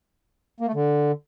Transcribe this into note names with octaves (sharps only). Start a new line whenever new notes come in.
A#3
A3
D3